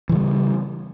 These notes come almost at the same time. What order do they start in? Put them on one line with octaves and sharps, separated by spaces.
E3 C#3 G3